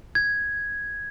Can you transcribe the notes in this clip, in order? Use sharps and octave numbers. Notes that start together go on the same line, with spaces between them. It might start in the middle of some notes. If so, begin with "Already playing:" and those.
G#6